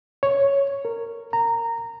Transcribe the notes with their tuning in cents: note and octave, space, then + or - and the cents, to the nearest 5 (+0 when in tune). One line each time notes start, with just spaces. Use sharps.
C#5 +5
A#4 -15
A#5 -15